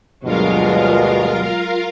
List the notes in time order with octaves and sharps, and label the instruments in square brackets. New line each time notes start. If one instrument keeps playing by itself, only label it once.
[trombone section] D2 G2 B2 [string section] F#3 G#3 [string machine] F4 A#4 F5